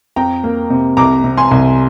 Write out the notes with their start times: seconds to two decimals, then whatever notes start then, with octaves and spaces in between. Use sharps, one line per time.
0.16 F2 G5 A#5
0.44 A#3
0.70 C3
0.97 C2 A#5 D6
1.24 C3
1.38 G#5 C6
1.51 C2